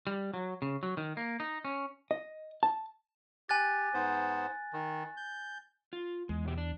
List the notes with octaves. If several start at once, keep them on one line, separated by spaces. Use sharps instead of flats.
G3
F#3
C#3
F#3
D#3
A#3
D#4
C#4
D#5
A5
G4 G#5 F#6 A6
G#2 B3 C5
D#3
G6
F4
E2 G#3
B2 G4
D4